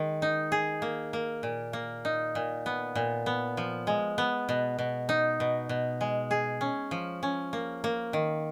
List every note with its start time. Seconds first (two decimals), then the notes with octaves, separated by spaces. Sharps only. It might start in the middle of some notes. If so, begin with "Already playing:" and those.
Already playing: D#3 G#3
0.22 D#4
0.52 G#4
0.82 A#3
1.13 A#3
1.43 A#2
1.73 A#3
2.05 D#4
2.35 A#2
2.66 B3
2.95 A#2
3.26 B3
3.57 F3
3.87 G#3
4.18 B3
4.49 B2
4.79 B2
5.09 D#4
5.40 B2
5.69 B2
6.01 G#3
6.31 G#4
6.61 C#4
6.91 F3
7.23 C#4
7.53 A#3
7.84 A#3
8.13 D#3